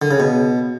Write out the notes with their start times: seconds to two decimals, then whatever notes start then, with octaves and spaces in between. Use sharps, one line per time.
0.02 D3
0.11 C#3
0.20 B2